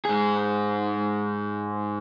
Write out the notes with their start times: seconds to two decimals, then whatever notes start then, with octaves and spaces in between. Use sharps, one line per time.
0.05 G#2 G#4